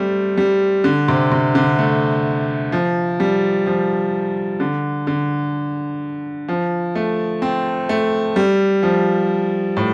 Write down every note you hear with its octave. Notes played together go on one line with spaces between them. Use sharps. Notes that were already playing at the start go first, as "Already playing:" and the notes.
Already playing: G3 A3 C4
G3
D3
C3
C3
D3
A3
F3
G3
F3
D3
D3
F3
A3
C4
A3
G3
F3
A2